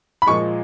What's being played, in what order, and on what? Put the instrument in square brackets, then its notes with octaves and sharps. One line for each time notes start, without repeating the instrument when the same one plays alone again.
[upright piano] B5
A#2 F3 G#3 C#6